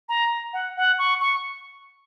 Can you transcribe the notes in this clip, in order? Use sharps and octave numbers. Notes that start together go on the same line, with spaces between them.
A#5
F#5
F#5
C#6
C#6